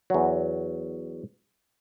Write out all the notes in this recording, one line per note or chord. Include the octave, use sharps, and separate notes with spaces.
E2 F#3